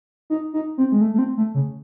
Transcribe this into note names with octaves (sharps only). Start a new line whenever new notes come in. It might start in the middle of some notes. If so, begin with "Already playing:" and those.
D#4
D#4
C4
G#3
A3
A3
C4
A3
C#3